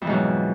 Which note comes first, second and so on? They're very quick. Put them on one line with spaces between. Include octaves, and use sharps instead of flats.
F2 E3 G#2 B2 F#3